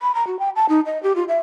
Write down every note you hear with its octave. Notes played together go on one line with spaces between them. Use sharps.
B5
A#5
F#4
G5
A5
D#4
D#5
G4
F4
E5